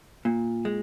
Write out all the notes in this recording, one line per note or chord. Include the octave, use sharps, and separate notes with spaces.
A#2
G#3